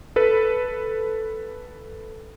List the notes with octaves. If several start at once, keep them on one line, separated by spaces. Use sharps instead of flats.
A4 B4